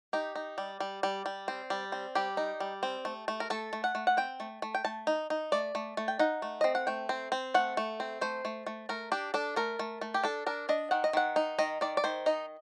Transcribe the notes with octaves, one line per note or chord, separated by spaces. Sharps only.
D#4 G4
D#4
G3
G3
G3
G3
C4
G3
C4
G3 G4
D#4
G3
C4
A3
A3
A#4
A3 A4
A3
F#5
A3
F#5
C4 G5
A3
A3
G5
A3 A5
D#4
D#4
A3 D5
A3
A3
G5
D#4 F#5
A3
C4 D#5
F#5
A3 G5
C4
C4
A3 F#5
A3
C4
A3 C5
A3
A3
A3 A#4
D4 G4
D4 A4
A3 A#4
A3
A3
G4
D4 A4
D4 A#4
D4 D#5
D#3 F#5
D#5
D#3 F#5
D#4
D#3 D#5
D#3 D5
D5
D#3 C5
D#4 D#5